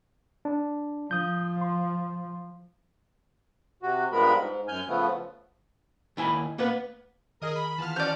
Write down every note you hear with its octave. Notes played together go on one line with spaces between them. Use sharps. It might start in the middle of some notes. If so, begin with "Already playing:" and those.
D4
F3 D#6 G6
C6
C3 F#4
G2 F3 G#3 B3 A#4 B5
G#2
F#2 G#5 F6 G6
C#3 F3 A3 B3
D#2 E4 G#5 A5 B5
A#3 B3 B4
D#3 G#4 A#4 D#5 D#6
B5
E3 B3 F4 G#4 A5 F6
C#4 F#4 C5 D5 G6